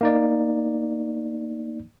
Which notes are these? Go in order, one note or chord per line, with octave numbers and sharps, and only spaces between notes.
A#3 D#4 D5